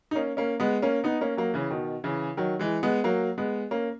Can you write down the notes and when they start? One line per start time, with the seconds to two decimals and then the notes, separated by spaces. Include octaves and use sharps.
0.11 D#4
0.15 A#3 C#4
0.37 A#3 C#4
0.60 G#3 B3
0.82 A#3 C#4
1.04 B3 D#4
1.21 A#3 C#4
1.37 F#3 A#3
1.54 C#3 E3
1.70 B2 D#3
2.04 C#3 E3
2.37 D#3 F#3
2.59 E3 G#3
2.83 G#3 B3
3.04 F#3 A#3
3.38 G#3 B3
3.71 A#3 C#4